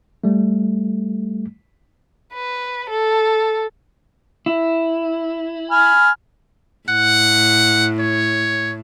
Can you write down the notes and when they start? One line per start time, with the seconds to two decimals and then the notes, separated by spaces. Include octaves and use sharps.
0.24 G3 A3
2.33 B4
2.90 A4
4.46 E4
5.71 G#5 B5 F6
6.89 A2 F#5
7.99 C#5